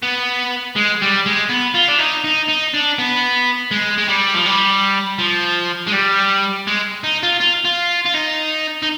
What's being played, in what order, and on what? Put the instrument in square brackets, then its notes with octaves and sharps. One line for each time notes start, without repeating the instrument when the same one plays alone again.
[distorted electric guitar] B3
G#3
G3
G#3
B3
F4
D4
D#4
D#4
D#4
D4
B3
G#3
G#3
G3
F3
G3
F3
G#3
G3
G#3
D#4
F4
F4
F4
F4
D#4
D#4